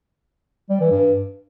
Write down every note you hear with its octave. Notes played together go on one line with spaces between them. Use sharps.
G3
E3
G2